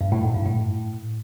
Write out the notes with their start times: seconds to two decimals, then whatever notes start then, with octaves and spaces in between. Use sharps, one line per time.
0.01 G2
0.12 A2
0.23 G#2
0.35 G2
0.46 A2